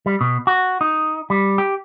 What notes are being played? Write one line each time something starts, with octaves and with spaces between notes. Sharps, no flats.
G3
B2
F#4
D#4
G3
G4